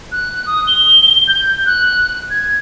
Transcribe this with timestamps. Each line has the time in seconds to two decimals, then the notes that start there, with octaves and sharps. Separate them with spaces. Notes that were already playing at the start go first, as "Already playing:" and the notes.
0.12 F#6
0.47 D#6
0.67 G7
1.28 G6
1.66 F#6
2.30 G#6